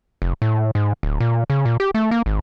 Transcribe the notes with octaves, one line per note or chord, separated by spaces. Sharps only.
F1
A2
G#2
D1
A#2
C#3
A#2
G4
A3
A#3
G#1